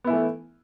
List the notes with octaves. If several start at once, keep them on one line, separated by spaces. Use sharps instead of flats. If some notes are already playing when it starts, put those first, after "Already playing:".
E3 A3 B3 E4